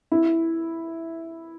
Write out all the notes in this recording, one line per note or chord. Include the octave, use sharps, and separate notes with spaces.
E4